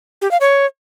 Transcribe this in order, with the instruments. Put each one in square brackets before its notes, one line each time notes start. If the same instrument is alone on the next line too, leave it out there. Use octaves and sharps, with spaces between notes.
[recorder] G4
F5
C#5